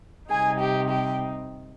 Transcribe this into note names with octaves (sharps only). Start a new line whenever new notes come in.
C3 G3 C4 D#4 G#4 G#5
G4 G5
G4 G5